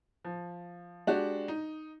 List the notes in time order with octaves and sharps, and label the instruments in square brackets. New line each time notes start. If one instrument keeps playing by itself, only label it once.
[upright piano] F3
G#3 D4 F#4 G4
D#4